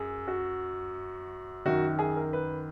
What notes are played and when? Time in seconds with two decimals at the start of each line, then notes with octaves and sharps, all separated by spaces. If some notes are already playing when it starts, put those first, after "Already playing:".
Already playing: F#2 G#4
0.28 F#4
1.66 F#2 D#3 F#4
1.99 G#4
2.17 A#4
2.33 B4